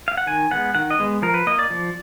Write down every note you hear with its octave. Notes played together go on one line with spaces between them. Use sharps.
F5
F#5
D#3 G#5
G#3 B3 F#5
D#3 F#5
D#5
G#3 B3
F3 A#4
B4
A#3 D#5
D5
F3